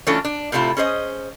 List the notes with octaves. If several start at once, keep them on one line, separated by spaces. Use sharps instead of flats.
E3 A3 C#4 D4 F4 A4
D4
A2 C3 A3 E4 F4
C#4 G#4 C5 D#5